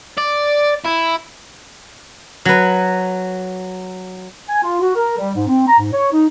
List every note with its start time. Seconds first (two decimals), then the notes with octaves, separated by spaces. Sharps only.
0.18 D5
0.86 E4
2.45 F#3 B4
4.49 G#5
4.63 F4
4.81 F#4
4.95 A#4
5.18 G3
5.35 G#2
5.48 C4
5.67 A#5
5.79 G#2
5.93 C#5
6.13 D#4